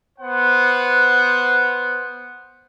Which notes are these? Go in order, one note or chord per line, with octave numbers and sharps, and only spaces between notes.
B3 C5 F#5